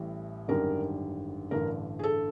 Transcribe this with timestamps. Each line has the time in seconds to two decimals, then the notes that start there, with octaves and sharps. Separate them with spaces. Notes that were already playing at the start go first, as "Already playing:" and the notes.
Already playing: A1 A2 E3 G3
0.48 G#1 F#2 D3 G3 A#4
1.51 A1 G2 D3 A#4
1.99 G#4
2.03 A4